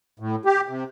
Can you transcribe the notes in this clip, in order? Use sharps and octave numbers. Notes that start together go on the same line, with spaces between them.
A2
G4
C3